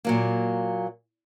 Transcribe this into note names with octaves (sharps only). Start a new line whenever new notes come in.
A#2 F#3 A#3